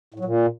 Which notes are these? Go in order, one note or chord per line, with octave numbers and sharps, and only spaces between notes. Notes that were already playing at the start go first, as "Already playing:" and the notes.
A2
F#3
A#2